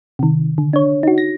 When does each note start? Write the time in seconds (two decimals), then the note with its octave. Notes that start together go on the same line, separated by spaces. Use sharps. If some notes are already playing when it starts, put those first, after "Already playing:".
0.19 C3 D#3
0.58 D3
0.73 D4 C#5
1.03 D#4 F#4
1.18 A#6